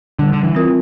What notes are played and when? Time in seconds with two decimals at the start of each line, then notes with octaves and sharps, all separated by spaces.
0.19 D3 G3
0.33 D3
0.44 E3
0.55 C4 F4 A#4